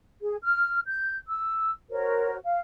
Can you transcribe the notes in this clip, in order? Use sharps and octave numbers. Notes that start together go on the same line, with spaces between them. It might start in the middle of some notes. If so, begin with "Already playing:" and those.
G#4
F6
G6
E6
F#4 A#4 C5 C#5
F5